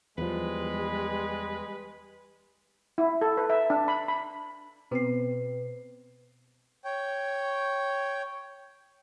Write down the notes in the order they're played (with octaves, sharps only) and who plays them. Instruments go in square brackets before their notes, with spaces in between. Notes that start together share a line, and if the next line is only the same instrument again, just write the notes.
[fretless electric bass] E2 F3 [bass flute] G3 [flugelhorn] G#3 [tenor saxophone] B4
[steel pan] E4
A4
B4
E5
D4
B5
B5
[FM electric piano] B2 C4 [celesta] B4 C7
[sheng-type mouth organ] C#5 G5